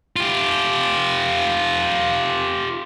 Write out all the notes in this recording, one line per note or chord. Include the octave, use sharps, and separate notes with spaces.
F4 G4